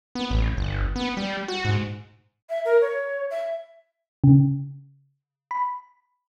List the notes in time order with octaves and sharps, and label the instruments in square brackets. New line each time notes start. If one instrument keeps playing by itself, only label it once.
[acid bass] B3
A1
G1
B3
G3
F#4
G#2
[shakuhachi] E5
A#4
C#5
E5
[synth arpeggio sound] C#3
B5